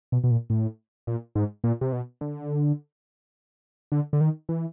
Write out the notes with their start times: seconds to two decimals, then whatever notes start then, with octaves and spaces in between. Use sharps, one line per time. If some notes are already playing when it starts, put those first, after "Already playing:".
0.12 B2
0.24 B2
0.31 A#2
0.50 A2
1.07 A#2
1.35 G#2
1.64 A#2
1.81 C3
1.93 B2
2.21 D3
3.92 D3
4.13 D3
4.21 D#3
4.49 E3